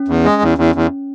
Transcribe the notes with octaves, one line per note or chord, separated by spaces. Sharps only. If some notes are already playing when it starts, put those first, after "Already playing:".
Already playing: C#4
E2
G#3
E2
E2
E2